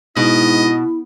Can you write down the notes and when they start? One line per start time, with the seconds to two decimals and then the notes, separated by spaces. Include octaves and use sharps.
0.16 G#2 B2 E4 D#5